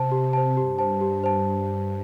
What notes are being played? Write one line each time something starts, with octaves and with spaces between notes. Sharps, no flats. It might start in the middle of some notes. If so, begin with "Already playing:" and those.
Already playing: C3 C5 A5
G4
C5 A5
G2 G4
C5 A5
G4
C5 A5